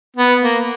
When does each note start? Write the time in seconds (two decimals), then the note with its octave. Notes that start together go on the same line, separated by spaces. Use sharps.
0.17 B3
0.42 A#3